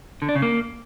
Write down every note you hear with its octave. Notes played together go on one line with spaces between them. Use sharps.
D3
D4
C#3
A#3